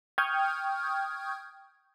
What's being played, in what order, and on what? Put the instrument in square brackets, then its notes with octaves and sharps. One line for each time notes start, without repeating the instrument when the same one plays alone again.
[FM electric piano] G5 C#6 D#6 F6 G6 G#6